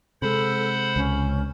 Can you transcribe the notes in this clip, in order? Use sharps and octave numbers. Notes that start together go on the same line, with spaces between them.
C3 G#3 A4 C5 F#5 B5
C#2 C#4